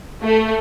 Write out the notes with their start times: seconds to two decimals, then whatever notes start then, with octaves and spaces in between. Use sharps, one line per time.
0.22 A3